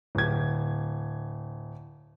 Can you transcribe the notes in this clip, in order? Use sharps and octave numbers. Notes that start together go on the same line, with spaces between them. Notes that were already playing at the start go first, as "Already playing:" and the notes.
D1 G#6